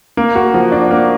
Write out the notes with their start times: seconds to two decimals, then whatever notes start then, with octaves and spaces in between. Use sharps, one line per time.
0.17 A#3
0.35 F#4
0.54 F3
0.72 D4
0.91 A#3